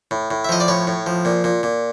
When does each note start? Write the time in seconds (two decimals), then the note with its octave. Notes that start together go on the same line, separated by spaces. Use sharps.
0.11 A2
0.31 A2
0.45 E5
0.49 F3 D#5
0.60 D5
0.68 A2 C#5
0.87 A2
1.06 F3
1.25 A#2
1.44 A#2
1.63 A#2